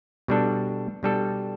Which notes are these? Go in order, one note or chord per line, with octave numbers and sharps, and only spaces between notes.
B2 G3 D4 A4
B2 G3 D4 A4